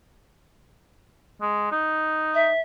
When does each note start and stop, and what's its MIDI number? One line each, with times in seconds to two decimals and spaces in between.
1.41 1.70 56
1.72 2.50 63
2.35 2.61 76